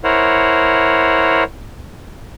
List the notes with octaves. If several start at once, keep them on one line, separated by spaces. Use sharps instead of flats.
E4 A#4 C5 C#5 F#5